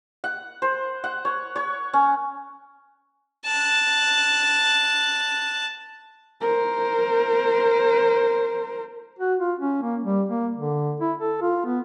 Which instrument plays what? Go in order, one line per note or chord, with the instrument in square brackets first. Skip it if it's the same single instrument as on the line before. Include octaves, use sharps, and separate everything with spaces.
[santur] F#5
C5
F#5
C#5
C#5
C#4
[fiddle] A5 F#6
[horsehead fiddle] A#4 C5
[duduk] F#4
F4
C#4
A#3
G3
A#3
D3
E4
A4
F4
B3